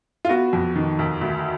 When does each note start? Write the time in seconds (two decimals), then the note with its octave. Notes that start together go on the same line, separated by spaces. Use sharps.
0.25 F4
0.29 B3 F#4
0.53 F2
0.76 D#3
0.99 D#2
1.21 D2